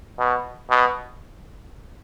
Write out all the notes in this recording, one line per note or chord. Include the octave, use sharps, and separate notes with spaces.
B2
B2